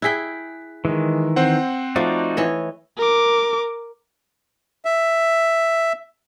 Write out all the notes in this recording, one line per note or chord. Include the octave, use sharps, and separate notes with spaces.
E4 G#4 G5 F#6 B6
D#3 E3 G#3
C4 C5 F#5
F3 A3 D#4 F#4 D5
E3 C#5 D#5
A#4 D6
E5